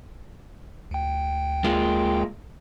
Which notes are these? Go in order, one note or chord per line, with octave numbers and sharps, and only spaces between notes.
D2 G5
G#3 A#3 F4